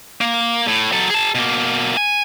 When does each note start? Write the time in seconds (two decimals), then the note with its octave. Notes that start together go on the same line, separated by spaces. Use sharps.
0.21 A#3
0.68 A2
0.92 F#3 A4
1.10 G#4 A5
1.35 B2 A#3
1.97 G#5